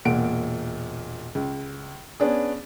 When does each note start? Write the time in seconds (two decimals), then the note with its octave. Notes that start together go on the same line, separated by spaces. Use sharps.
0.05 E1 A#2 F#5 D7
1.35 C#2
2.20 B3 C#4 D4 G#4